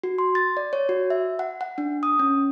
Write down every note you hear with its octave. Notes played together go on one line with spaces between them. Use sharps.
F#4
C6
A6
D5
C#5
F#4
E5
F#5
F#5
D4
D#6
C#4